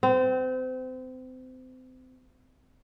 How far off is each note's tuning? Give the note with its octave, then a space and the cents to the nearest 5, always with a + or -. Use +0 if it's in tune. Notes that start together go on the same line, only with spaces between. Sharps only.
C4 -30